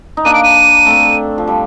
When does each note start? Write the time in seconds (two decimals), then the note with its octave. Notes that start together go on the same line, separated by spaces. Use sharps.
0.17 D#4
0.25 A#3 D4 D#7
0.34 D7
0.43 D#7
0.86 A3 C4
1.38 F3
1.47 G3